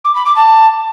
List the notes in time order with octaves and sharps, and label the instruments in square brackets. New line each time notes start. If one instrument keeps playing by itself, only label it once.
[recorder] D6
B5
D6
A5